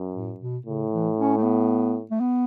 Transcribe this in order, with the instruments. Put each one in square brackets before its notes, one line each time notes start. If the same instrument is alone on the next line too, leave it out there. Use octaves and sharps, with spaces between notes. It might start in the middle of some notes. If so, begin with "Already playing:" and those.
Already playing: [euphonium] F#2
[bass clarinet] A2
B2
[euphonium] A2 [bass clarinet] C#3
[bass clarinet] E3
C#4
A3
B3
A3
B3